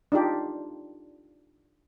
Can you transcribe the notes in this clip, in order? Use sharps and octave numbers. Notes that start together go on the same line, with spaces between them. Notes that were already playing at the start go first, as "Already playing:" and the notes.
D4 D#4 F4 G4